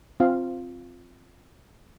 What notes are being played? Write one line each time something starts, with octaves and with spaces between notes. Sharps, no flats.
C4 F4 F5